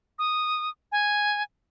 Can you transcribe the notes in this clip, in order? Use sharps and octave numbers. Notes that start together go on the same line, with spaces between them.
D#6
G#5